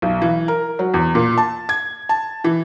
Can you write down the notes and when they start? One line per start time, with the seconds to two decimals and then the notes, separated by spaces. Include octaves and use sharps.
0.02 B1
0.22 E3
0.48 A#4
0.79 F#3
0.94 E2
1.15 A#2
1.37 A5
1.69 G#6
2.09 A5
2.44 E3